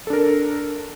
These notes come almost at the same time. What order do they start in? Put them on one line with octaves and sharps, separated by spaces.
A4 D4 A#4